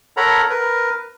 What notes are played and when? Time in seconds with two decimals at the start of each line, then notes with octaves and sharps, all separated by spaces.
0.17 A4 A#4 C#5 F#5 A#5 B5
0.50 A#4 B4